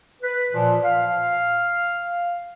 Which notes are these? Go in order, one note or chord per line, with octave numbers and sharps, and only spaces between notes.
B4
A#2 F3
F5